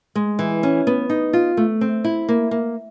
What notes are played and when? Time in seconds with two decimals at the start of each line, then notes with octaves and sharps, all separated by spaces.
0.15 G#3
0.39 E3
0.63 C#4
0.87 B3
1.10 D#4
1.33 F4
1.57 A3
1.81 C4
2.04 E4
2.29 A#3
2.51 A#3